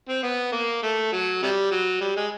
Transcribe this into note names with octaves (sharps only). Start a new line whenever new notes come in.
C4
B3
A#3
A3
F#3
C3 G3
F#3
G3
G#3